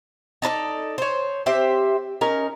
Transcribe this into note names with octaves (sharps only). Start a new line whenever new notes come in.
D#4 A4 B4 D5
C5 C#5
C4 G4 C5 E5
C#4 D#4 A#4